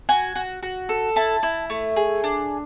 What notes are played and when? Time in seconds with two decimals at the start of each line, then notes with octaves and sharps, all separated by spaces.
0.09 F#4 G#5
0.36 F#4
0.63 F#4
0.89 A4
1.16 E4 A5
1.43 E4
1.70 A3
1.96 G#4
2.24 D4